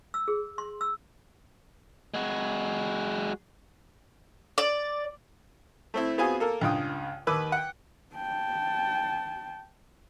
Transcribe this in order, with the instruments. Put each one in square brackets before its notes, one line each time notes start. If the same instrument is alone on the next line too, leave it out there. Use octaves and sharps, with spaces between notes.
[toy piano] E6
G#4
C6
E6
[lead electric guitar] G#3 F#4
[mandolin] D5
[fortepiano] A3 C4 E4
B3 C4 F4 F#4 G#4 G#5
A#3 A4 A#4
C#2 G2 F4 G5 D#6
D#2 D#3 B4 B5 D6 E6
F#5 G5
[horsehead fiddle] G5 A5